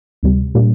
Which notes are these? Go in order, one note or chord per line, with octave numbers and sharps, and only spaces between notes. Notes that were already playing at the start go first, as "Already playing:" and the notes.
D2 C3 G3
A#2 G3 A#3 D4